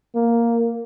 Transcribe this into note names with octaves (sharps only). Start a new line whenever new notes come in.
A#3